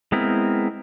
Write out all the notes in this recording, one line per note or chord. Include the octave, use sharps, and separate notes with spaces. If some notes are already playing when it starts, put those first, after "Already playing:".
G#3 B3 C4 E4 A#4